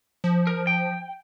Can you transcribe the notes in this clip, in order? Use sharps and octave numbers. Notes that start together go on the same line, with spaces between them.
F3
A#4
G5